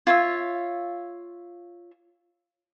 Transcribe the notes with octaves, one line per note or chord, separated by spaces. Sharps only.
F4 C#5 E5